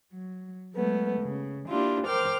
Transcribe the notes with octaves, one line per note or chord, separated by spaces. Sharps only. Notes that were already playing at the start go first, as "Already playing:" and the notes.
F#3
F#3 G#3 A3 B3
C#3
A#3 D4 E4 F4 G4
A#4 C5 G5 D6 F6